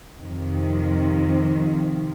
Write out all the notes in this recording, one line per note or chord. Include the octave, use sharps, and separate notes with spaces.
F2 C3 D#3 F3